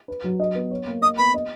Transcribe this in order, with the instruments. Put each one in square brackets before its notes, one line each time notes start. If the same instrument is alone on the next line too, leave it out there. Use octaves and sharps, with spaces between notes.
[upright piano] B4
F#3
D#5
B3
C#5
A#3
[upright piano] D#5 [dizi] D#6
[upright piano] B3 [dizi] B5
[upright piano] D#5